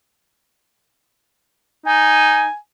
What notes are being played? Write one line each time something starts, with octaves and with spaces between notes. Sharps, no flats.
D#4 G#5